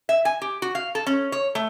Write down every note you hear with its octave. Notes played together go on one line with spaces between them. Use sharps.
E5
G#5
G4
F#4
F5
A4
C#4
C#5
A3